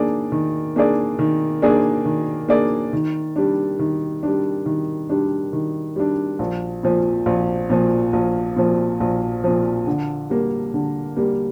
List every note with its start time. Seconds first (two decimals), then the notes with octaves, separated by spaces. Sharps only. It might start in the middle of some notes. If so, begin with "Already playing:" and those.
Already playing: D#3 A#3 D4 G#4 D5
0.32 D#3
0.76 A#3 D4 G#4 D5
1.19 D#3
1.62 A#3 D4 G#4 D5
2.05 D#3
2.49 A#3 D4 G#4 D5
2.93 D#3
3.36 G3 D4
3.79 D#3
4.23 G3 D4
4.66 D#3
5.10 G3 D4
5.53 D#3
5.96 G3 D4
6.39 A#1
6.83 A#2 F3
7.26 A#1
7.70 A#2 F3
8.13 A#1
8.56 A#2 F3
9.00 A#1
9.44 A#2 F3
9.87 D3
10.30 G3 A#3
10.74 D3
11.17 G3 A#3